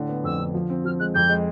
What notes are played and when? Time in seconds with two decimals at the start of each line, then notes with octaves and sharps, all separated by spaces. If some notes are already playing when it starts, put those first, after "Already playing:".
Already playing: A2 D3
0.09 B3
0.24 F2 E6
0.40 D3
0.54 F3
0.70 C4
0.85 F3 F6
0.99 G#3 F#6
1.14 F2 G6
1.29 G#3